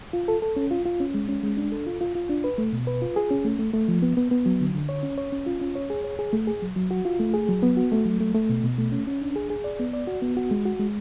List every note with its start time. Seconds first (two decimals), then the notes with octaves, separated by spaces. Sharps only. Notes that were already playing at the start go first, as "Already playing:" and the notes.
0.13 F4
0.28 A4
0.42 A4
0.56 C#4
0.71 F4
0.85 F4
1.00 C#4
1.14 G#3
1.28 C#4
1.43 G#3
1.57 D4
1.72 A4
1.87 F4
2.01 F4
2.15 F4
2.29 D4
2.44 B4
2.58 A3
2.73 B2
2.87 B4
3.02 F4
3.16 G#4
3.31 C#4
3.44 A3
3.59 A3
3.74 A3
3.88 F3
4.02 B3
4.17 B3
4.31 B3
4.46 F#3
4.60 D3
4.75 D3
4.89 C#5
5.03 C#4
5.18 C#5
5.32 C#4
5.46 F4
5.61 C#4
5.75 C#5
5.90 G#4
6.04 C#5
6.19 G#4
6.33 A3
6.47 G#4
6.62 F#3
6.76 F#3
6.91 F#4
7.05 F4
7.19 A3
7.34 G#4
7.49 F#3
7.63 B3
7.77 F#4
7.92 A3
8.06 F#3
8.21 A3
8.35 A3
8.50 B2
8.64 B2
8.78 A3
8.92 C#4
9.07 C#4
9.22 D4
9.36 G#4
9.50 G#4
9.64 D5
9.79 B3
9.93 D5
10.07 F#4
10.22 B3
10.37 F#4
10.51 G#3
10.65 F#4
10.80 G#3